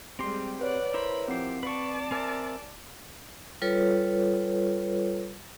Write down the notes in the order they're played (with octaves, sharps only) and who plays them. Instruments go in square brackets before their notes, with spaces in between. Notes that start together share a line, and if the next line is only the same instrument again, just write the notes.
[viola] G3 G#3 [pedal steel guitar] C4 G4 C6
[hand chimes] B4 C#5 [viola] D5 F#5
[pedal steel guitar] E4 A#4 C5 [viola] B5
[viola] F3 G4 [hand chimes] C4 C7
[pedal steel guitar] B4 C#6 [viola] D5 A5
[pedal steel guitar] C4 A#4 E5 [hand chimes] G#5 D6 A6
[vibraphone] G3 F4 A4 B4 C#5